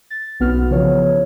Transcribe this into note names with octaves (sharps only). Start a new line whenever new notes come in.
A6
B1 B3 F#4 F6
C#3 E3 F3 C#5